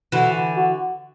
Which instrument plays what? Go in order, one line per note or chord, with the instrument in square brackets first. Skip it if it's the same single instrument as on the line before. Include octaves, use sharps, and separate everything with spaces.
[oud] D3 E3 [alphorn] F#4
[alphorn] F#4